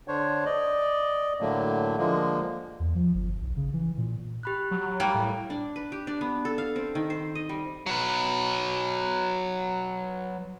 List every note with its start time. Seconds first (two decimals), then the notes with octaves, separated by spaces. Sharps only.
0.08 D3 D4 C5 C#5
0.45 D5 D#5
1.41 A2 D3 F#3 A3 A#3
1.97 D3 F3 G#3 A#3
2.80 E2
2.95 F3
3.15 G1
3.42 B1
3.57 C#3
3.73 E3
3.97 A#2
4.43 G4 B5 F#6
4.71 F#3
5.00 G3 A#3
5.14 A2
5.50 D4
5.76 B4
5.92 G4
6.07 D4
6.21 B3
6.45 A4
6.58 F5
6.76 C4
6.95 D#3
7.10 C5
7.35 D#5
7.49 G3
7.86 F#3 B4